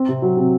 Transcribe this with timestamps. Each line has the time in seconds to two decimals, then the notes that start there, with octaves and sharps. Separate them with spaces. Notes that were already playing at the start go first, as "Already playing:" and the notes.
Already playing: C4
0.08 C3
0.22 F#3
0.37 C3